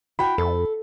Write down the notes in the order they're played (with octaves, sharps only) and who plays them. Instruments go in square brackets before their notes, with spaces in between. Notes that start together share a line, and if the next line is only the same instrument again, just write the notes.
[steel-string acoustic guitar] E4 F#4 G5 [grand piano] B5
[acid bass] F2 [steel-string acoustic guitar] A4